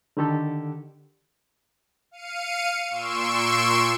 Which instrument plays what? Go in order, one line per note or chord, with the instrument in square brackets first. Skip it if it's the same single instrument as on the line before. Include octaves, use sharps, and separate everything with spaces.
[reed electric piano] D3 D#3 G4 A4
[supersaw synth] F5 C#7 D#7
A#2 C6 C#6 E6 D7 E7